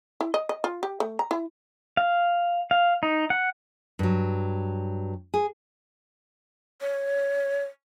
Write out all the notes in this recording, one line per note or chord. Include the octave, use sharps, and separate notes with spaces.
E4
D#5
D#5
F4
G4
A3
A#5
E4
F5
F5
D#4
F#5
G2 F#3
G#4
C#5